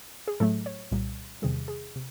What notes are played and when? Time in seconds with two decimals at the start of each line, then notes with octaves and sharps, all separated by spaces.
0.28 G#4
0.40 A2 F#3 A3 A4
0.66 C#5
0.91 C2 A#2 G3
1.42 E2 C3 D#3 G3 G#4
1.68 G#4
1.96 C3